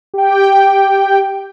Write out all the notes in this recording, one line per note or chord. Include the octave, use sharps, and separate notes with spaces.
G4 G5